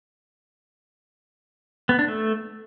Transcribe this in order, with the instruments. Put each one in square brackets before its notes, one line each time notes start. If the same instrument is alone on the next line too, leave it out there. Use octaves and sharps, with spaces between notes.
[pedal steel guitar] B3
D4
A3